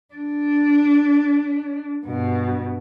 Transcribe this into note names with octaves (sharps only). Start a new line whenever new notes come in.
D4
G2 B2